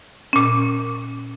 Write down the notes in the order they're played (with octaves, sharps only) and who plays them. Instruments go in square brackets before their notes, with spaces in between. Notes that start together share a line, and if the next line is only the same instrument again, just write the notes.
[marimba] A#2 C#4